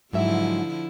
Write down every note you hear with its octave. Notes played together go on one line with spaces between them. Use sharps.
G#2 D3 F3 F#3 E4 E5